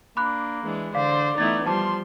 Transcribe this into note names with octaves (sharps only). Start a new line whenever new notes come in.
A#3 D4 B5 D6 F#6
E3 G#3 D4
D3 C5 D5 F5
E3 A3 B3 D#4 E4 G#6 A6
F3 G3 C5 A5 C6 D6